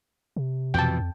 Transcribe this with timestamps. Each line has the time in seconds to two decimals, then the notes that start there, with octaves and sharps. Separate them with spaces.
0.36 C3
0.74 F2 B2 E3 G5 A5
0.99 F2